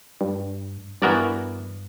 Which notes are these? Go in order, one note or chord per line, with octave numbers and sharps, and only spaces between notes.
G2
G2 E3 B3 F#4 A#4 D5